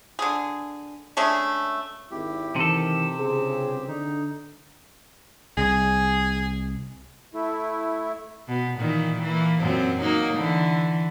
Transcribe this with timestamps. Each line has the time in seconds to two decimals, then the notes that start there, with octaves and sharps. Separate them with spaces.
0.19 D3 G#4
1.17 G#3 A3 C#4 D4
2.11 G#1 E4 G4
2.56 C3 D#3 E3 A4
3.18 G1 C#3 C4 G#4
3.88 D3 D#4
5.58 C2 G#4
7.34 A3 E4
8.48 B2
8.79 A#2 D#3 E3
9.22 E3 A#3
9.59 F#2 A#2 C4
10.02 F#3 A#3 D#4
10.34 D3 E3